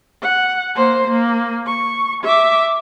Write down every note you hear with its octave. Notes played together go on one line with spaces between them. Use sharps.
F#5
A#3 C5
A#3
C#6
E5 D6